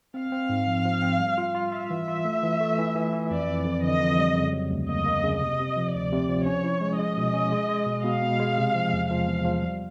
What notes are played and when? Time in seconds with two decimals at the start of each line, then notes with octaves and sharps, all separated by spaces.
0.14 C4 F5
0.32 C4
0.49 G#2
0.67 F3
0.85 F3
1.02 C4
1.20 G3
1.38 F4
1.55 F4
1.72 F4 E5
1.90 E3
2.08 F4
2.25 A3
2.43 E3
2.61 A3
2.78 E3
2.95 E3
3.13 E3
3.31 F2 D5
3.48 F2
3.65 F2
3.83 D3 D#5
4.01 F2
4.19 G3
4.35 C#3
4.53 F#3
4.71 D2
4.88 A#3 D#5
5.06 A#3
5.24 C#3
5.41 C3 D#5
5.59 C3
5.76 F3
5.94 D2 D5
6.12 C3
6.29 F3
6.46 C#4 C#5
6.64 E4
6.81 G#3
6.99 G#3 D#5
7.17 B2
7.34 C#4
7.52 G#3
7.69 G#3
7.86 B2
8.04 B2 F5
8.22 B2
8.40 G#3
8.58 C3
8.75 F3
8.93 E2
9.10 F3 F5
9.28 E2
9.45 F3
9.63 G3